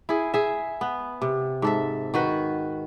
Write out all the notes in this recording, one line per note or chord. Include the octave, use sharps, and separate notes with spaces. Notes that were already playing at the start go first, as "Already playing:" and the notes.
E4 G#4
G#4 E5
B3
C3
G#2 A4 E5
D#3 F#4 B4